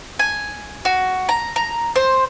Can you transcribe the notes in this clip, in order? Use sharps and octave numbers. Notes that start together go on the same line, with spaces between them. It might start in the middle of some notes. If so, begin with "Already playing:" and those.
G#5
F#4
A#5
A#5
C5